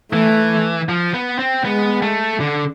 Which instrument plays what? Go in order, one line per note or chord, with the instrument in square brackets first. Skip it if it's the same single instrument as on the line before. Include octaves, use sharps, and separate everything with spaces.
[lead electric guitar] E3 [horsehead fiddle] A3
[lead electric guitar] F3
B3
C4
[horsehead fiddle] G#3 [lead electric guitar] B3
[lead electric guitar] A3
D3